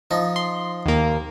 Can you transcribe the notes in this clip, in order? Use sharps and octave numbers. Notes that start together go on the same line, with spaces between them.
F3 D#4
C6
D#2 A#3